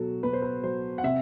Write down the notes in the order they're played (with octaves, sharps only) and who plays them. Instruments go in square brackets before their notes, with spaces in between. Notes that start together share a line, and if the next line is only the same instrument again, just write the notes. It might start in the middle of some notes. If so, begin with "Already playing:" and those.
Already playing: [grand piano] B2 F#3 F#4 A4
B2 B4
C5
B4
F#3 C5
F#5
C3 E5